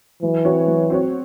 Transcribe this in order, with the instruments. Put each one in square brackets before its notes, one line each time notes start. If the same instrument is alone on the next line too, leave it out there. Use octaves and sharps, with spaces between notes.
[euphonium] E3 [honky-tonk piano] F#3
[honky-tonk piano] C4 F#4 C#5
F#3
C4 F#4 C#5